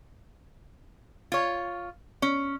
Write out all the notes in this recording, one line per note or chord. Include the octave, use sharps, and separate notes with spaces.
F4 C#5
C#4